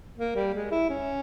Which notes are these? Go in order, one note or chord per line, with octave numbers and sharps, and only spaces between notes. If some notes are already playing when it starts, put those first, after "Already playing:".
A#3
G3
G#3
E4
C#4